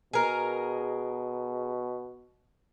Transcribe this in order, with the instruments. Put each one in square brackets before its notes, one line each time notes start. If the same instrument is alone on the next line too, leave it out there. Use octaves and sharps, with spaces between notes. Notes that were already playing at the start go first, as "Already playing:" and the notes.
[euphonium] B2 [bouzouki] G#4 A#4